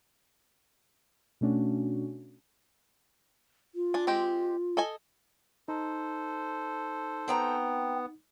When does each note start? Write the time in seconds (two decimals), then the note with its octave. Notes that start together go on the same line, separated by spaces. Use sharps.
1.41 B2 A3 C#4 D4 F#4
3.75 F4
3.94 D4 G#5
4.07 G#3 C4 G4
4.77 A4 D#5 G#5
5.68 D#4 A4 C5
7.28 B3 C4 G5 A#5